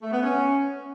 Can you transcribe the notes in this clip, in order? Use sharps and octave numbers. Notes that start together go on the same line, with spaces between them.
A3
B3
C#4